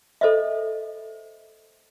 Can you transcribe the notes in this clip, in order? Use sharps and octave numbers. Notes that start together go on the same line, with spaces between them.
A4 C5 D#5 E5